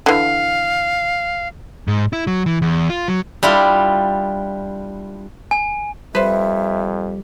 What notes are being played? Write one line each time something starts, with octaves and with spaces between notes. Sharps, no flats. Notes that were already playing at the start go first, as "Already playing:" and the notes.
D3 E3 F5
G#2
E4
F#3
E3
E2
F4
F#3
G3 D4 E4 F4 G4
G#5
F2 G3 B4 C5 E5